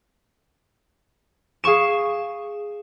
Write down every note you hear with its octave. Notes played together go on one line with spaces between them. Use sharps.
G#4 F5 C#6 E7